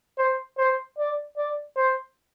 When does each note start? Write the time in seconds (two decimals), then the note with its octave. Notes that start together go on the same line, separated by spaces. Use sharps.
0.18 C5
0.58 C5
0.98 D5
1.37 D5
1.76 C5